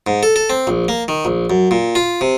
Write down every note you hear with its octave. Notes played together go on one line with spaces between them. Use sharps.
G#2
A4
A4
C4
A#1
A#3
D#3
A#1
F#2
A#2
F4
C3